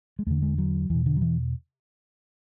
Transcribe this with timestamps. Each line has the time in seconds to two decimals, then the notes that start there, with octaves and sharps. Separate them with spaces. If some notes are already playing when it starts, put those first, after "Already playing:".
0.19 G#3
0.27 E2 D3 A3
0.42 G#3
0.58 F#3
0.90 E2 B2 E3
1.06 D3
1.16 F#3
1.22 E3